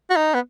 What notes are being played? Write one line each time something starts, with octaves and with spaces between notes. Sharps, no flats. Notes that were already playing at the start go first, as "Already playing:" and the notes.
F#4
D#4
B3